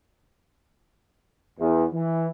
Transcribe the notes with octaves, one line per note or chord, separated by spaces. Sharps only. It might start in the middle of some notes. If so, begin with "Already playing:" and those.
E2
E3